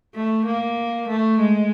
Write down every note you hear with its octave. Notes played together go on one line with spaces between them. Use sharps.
A3
A#3
A3
G#3